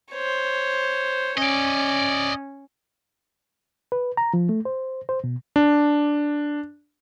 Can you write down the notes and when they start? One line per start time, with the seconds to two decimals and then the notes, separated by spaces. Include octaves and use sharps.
0.12 C5 C#5
1.38 C#4 D5 D#5
3.92 B4
4.17 A#5
4.34 F3
4.49 A3
4.65 C5
5.09 C5
5.24 B2
5.56 D4